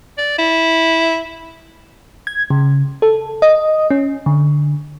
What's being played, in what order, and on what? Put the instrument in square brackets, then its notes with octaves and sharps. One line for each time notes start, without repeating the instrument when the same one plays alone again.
[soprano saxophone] D5
E4
[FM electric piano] G#6
C#3
A4
D#5
C#4
D3